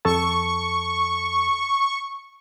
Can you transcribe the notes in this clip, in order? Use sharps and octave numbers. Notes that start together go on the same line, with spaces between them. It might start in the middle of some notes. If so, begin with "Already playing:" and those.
F2 A4 A5 C#6